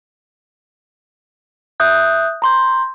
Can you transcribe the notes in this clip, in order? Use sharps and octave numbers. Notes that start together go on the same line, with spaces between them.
E5 D#6 F#6 G6
A#5 C6 G6